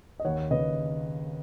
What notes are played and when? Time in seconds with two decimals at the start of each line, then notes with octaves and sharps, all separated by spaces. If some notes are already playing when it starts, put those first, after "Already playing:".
0.20 D#5
0.25 D#2 C#5 F#5
0.51 C#3 B4 D#5